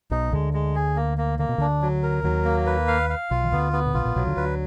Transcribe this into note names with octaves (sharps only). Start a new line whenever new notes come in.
B1 B2 D#4
D2 D3 G#3
G#3
G#4
A#3
A#3
D3 A#3
B2
D2 D3 D4
F#3
A#4
D#2 D#3 F#3
A#3
B4
F5
F5
B1 B2 F4
D#3
D2 D3 B3
B3
A#2
B1 B2 F4
A#1 A#2
B1 B2 F#3
D2 D3
D2 D3 B4